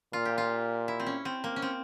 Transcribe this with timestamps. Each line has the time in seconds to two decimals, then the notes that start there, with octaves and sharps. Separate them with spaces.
0.13 A#2 F4
0.25 G4
0.38 F4
0.88 E4
1.00 C4
1.07 C#4
1.25 C4
1.44 A#3
1.56 C#4
1.62 C4